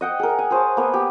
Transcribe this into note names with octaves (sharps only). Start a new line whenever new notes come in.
D#5 F#5 G5
G#4 A#4
G#5
G#4 C5 C#5 A5
A#3 B3
G4